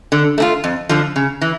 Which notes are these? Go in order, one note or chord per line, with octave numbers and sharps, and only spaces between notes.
D3
A3 D4 F4
F2
D3 F3
C#3
E3